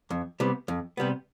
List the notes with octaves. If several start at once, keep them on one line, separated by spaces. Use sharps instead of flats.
F2
C3 G3 B3
F2
C3 G3 B3